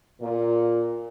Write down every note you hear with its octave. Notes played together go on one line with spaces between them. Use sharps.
A#2